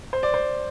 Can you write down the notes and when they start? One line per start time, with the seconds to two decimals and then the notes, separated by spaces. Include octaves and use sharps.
0.13 C5
0.23 D5
0.34 C5